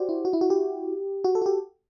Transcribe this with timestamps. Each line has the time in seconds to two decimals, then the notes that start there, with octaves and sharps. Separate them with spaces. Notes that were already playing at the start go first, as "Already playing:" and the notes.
Already playing: F#4 G4 C5 D5
0.09 E4
0.25 F#4
0.33 E4
0.41 F#4
0.50 G4
1.24 F#4
1.35 A4
1.42 F#4
1.46 G4